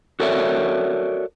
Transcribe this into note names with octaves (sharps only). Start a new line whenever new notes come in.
F#4 A4 A#4 C#5 D5 E5